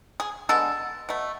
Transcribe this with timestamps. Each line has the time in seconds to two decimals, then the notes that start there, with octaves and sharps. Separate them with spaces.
0.20 G#4
0.49 D3 G#3 B3 A4
1.09 B2 A3